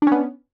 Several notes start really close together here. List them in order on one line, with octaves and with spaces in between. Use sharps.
D4 C#4 B3